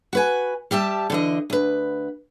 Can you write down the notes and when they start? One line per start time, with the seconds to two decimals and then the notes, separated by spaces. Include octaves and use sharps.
0.13 F#4 B4 G#5
0.71 G3 G4 E5 A5
1.10 D3 E3 D#5
1.50 D2 B4